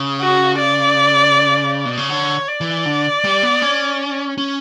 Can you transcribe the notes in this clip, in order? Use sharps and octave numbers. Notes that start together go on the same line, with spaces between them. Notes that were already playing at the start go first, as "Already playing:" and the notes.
Already playing: C#3
F#4
D5
B2
C#3
D3 C#5
D5
E3
D3
G3
B3
C#4
C#4